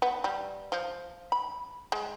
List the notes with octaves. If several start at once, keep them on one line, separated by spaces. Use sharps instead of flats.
B3
G3
F3
B5
G#3